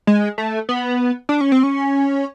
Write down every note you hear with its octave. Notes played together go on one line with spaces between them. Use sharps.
G#3
A3
B3
D4
C#4
C4
C#4